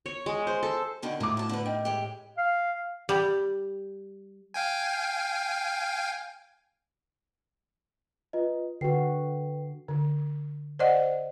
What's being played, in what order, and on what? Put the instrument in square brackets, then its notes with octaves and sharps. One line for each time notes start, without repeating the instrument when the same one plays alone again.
[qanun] C#5
G#3
C5
A4
[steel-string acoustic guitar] B2 D3 D#3
[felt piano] A2 D6 [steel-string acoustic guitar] E4 F4 A#5
[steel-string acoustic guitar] F#2 A5
D3 B4
D#3
G#3 G4
[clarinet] F5
[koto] G3
[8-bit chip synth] F5 G5 G#5
[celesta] F4 B4 D#5
[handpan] D3 F#4 [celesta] B4 G5 C7
[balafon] D3
C5 D5 D#5 F#5